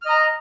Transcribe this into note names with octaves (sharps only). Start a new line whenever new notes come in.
D#5 A#5 F6